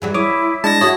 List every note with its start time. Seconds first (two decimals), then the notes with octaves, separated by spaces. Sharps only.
0.02 E3 F#3 G3 G#4
0.14 E4 C#5 D6 D#6
0.64 G#3 D4 A5 A#6
0.81 E4 F#4 C#5 D#6